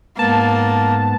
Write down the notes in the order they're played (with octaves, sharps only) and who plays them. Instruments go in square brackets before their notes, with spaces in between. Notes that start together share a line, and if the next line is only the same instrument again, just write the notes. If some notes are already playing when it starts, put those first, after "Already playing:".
[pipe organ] G#2 B3 [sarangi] A#3 [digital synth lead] A5